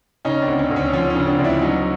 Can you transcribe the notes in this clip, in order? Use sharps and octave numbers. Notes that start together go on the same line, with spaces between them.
C#3 C#4 D#4
C4 D4
D2
C#4
D2
C#4
F3 C#4
C#4
C#3
C4 D4
D2
D4 E4
F#3 C#4 D#4